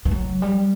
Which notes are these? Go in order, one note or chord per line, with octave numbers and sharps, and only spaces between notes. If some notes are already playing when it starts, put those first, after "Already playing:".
E3
F#3
G3